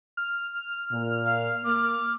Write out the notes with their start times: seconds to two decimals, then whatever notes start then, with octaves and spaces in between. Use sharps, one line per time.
0.17 F6
0.91 A#2
1.26 F5
1.64 A#3 D6